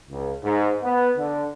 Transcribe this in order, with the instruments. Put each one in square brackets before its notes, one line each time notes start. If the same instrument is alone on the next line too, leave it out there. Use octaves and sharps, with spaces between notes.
[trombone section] C#2
G#2
B3
D3